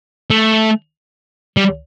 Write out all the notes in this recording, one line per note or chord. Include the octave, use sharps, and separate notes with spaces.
A3
G3